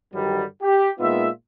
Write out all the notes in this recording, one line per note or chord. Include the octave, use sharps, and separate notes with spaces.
G2 D3 D#3 F#3 G3
G4
A#2 G#3 B3 D#4 F4 E5